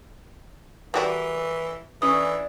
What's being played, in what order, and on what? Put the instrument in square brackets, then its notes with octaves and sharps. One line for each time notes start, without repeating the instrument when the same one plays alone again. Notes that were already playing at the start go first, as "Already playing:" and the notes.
[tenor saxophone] E3 [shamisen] G3 F#4 D5 [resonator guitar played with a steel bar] A#4 B4
[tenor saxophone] E3 [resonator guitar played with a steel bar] C#4 D4 B4 [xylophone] D#6